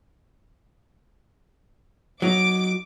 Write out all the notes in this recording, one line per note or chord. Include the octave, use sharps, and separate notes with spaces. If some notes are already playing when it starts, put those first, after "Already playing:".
F#3 D#4 D6